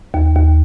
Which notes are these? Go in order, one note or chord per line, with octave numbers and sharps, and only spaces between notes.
D#2
D#2